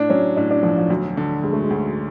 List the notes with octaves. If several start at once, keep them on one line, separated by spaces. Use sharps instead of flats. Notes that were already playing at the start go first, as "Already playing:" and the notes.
Already playing: A2 D4
F#3 C#4
A2 D4
D4
B1 F3
F3
D2 F#3
D3
D2 G#3
A3
G#3
D2